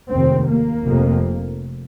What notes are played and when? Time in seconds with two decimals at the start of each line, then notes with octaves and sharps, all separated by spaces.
0.11 F1 D#2 C4
0.49 A#3
0.85 F1 F2 C3